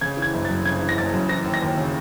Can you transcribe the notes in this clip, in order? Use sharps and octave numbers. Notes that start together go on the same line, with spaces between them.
C#3 G#6
E3
G#6
F#1
F#2 A6
C#3 G#6
E3
A#6
F#1 A6
F#2
E3 A#6
D#2
A#6
D#2
C#3